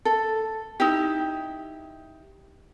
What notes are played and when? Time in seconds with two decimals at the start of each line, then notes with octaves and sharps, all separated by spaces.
0.05 A4
0.80 D#4 E4 G4